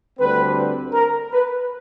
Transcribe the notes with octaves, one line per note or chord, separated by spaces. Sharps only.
D2 D3 G3 C4 B4
A#4
B4